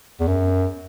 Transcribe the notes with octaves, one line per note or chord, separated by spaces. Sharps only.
E2
F#2